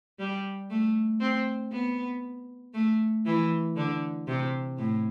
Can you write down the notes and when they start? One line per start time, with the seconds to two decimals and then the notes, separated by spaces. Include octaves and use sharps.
0.19 G3
0.70 A3
1.20 C4
1.72 B3
2.74 A3
3.26 E3
3.76 D3
4.27 C3
4.78 A2